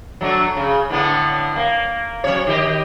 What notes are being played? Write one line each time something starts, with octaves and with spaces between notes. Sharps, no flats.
F#3 A3 D4
C#3
A2 D3 B3
A#3
F#3 C#4 C#5
D#3 G4 D#5